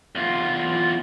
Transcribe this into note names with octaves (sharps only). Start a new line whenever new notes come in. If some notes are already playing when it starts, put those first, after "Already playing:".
E2 F4